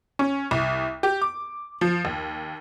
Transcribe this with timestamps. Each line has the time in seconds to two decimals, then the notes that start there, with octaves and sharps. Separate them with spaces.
0.19 C#4
0.51 C2
1.03 G4
1.22 D6
1.81 F3
2.05 D#2